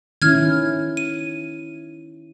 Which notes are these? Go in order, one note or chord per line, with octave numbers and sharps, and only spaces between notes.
D#3 C#4 E4 F6 G#6
D#7